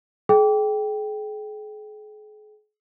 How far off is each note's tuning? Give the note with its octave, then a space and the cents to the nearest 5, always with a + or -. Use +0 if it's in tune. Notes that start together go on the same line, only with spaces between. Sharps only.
G#4 +40 G5 +0